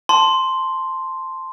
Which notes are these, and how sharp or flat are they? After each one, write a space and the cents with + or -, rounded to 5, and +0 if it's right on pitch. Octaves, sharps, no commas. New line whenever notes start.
A5 +0 C6 +0